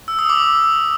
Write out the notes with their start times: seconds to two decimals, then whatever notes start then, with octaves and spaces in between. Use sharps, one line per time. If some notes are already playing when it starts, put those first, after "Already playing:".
0.08 E6
0.19 D#6
0.29 D6